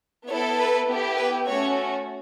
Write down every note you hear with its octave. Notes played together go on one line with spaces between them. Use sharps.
B3 E4 A4 C#5
B4
B3 E4 G4
B4
A3 C#4 F#4 C#5